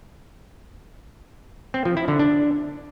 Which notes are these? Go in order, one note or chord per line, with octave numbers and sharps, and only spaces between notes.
C4
F3
E4
D3
D4